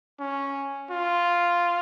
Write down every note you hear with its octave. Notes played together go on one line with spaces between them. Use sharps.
C#4
F4